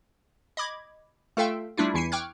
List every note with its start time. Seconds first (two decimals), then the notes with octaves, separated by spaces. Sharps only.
0.57 D#5 B5 D6 G#6
1.37 A3 F4 A4 E5 F5 G5
1.77 G3 A3 D4 E4 F4
1.94 E2 E3 E4 C7 C#7 D#7
2.12 G5 C#6 D6 F6 F#6 G#6